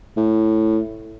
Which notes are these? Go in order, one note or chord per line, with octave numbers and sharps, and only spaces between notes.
A2